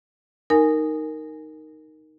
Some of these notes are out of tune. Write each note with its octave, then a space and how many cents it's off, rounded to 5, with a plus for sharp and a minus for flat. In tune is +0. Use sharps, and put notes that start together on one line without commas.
D#4 +0 A#4 -5 G#5 +0